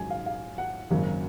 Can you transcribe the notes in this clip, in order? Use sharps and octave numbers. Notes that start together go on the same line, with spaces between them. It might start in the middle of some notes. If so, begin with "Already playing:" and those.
Already playing: A#1 G#2 D#3 F#3 C#4 G#5
F5
F5
F#5
G#1 F#2 C#3 F#3 A#3